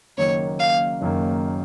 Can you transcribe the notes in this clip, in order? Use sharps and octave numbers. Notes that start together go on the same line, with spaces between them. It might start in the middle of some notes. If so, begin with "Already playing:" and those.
F#1 F#2 D#3 A#3 C#5
F5
F#1 F#2 D#3 A#3